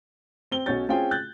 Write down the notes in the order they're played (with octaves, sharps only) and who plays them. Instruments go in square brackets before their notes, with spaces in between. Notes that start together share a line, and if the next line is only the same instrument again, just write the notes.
[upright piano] C4 G7
B1 C#4 F#4 C#5 G6 A6
C4 C#4 F4 G#4 G5
F#6 G6 A6